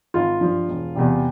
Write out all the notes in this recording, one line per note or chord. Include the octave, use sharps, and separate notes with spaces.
G#1 F4
G2 F3
E1
E2 C3 G3